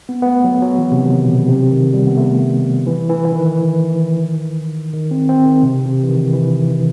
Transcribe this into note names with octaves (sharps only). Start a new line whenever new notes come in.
B3
B3
A3
F#3
F#3
E3
C3
D#3
B2
C3
D#3
G3
B3
A3
E3
E3
E3
D#3
D#3
C4
C4
D#3
C3
C3
E3
D#3
E3